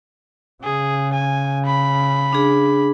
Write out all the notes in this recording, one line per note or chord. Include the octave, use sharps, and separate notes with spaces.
C#3 G#4
G#5
B5
D4 G#4